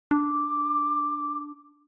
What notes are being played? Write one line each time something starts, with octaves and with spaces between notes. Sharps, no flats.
D4 D6